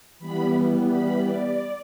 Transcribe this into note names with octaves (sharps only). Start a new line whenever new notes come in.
E3 G3 B3 B5
B5
D5